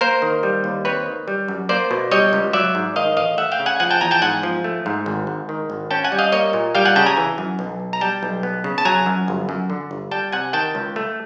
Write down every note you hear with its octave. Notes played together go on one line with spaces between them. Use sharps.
A#3 A#4 C5
D#3
G3
D#2
C4 B4 C#5
D#3
G3
F#2
A#3 C5 D5
B2
G3 C#5 D#5
C#2
F#3 D5 E5
G#2
D#3 D#5 F5
A1 D#5 F5
A3 E5 F#5
F5 G5
C#3
F#5 G#5
F3 F#5 G#5
G5 A5
E2 G#5 A#5
G5 A5
G#2 F#5 G#5
F3
A3
G#2
G#1
G#2
D#3
G#1
C#4 G5 A5
F#5 G#5
G3
D#5 F5
A#3 C#5 D#5
A#2
G3 F5 G5
F#5 G#5
C#3 G5 A5
G#5 A#5
E3
F#2
B1
B2
A#5
G3 G5 A5
B1
B3
C#3
A5
F#3 G#5 A#5
F#2
G1
F#2
D3
G1
G3 G5 A5
C3 F#5 G#5
D#3 G5 A5
C#2
A3